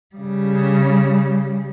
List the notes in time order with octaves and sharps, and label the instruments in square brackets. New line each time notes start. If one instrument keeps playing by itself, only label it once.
[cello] C#3 G3